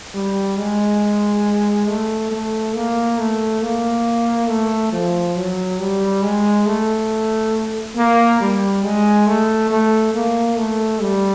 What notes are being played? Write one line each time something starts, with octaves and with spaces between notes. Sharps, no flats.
G3
G#3
A3
A3
A#3
A3
A#3
A3
F3
F#3
G3
G#3
A3
A#3
G3
G#3
A3
A3
A#3
A3
G3